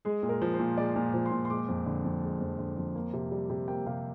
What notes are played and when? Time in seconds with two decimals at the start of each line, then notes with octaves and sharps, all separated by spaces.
0.05 G#3 G#4
0.23 A#2
0.29 A#4
0.42 F3
0.54 C5
0.59 A#2
0.78 G#3 D5
0.96 A#2
1.14 F3
1.26 C6
1.32 A#2
1.45 C6
1.50 G#3 D6
1.68 F2
1.86 D3
2.04 F2
2.23 G#3
2.41 F2
2.59 D3
2.77 F2
2.95 A#3
3.13 C3
3.31 G3
3.50 C3
3.68 A#3 G5
3.86 C3 F5